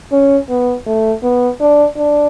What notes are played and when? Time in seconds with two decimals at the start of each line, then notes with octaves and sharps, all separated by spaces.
0.12 C#4
0.49 B3
0.87 A3
1.23 B3
1.60 D4
1.97 D4